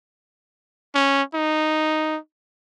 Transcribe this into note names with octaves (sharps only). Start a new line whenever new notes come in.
C#4
D#4